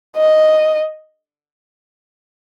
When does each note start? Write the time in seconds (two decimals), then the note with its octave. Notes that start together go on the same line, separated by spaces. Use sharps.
0.17 D#5